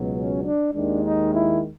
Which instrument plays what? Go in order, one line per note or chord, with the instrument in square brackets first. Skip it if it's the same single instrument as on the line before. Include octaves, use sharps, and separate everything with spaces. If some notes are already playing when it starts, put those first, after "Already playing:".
Already playing: [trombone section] C#2 B2 F#3
C#4
D4
D#2 D#3 G#3 D4
D#4
E4